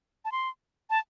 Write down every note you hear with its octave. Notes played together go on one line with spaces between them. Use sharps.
A5
C6
A5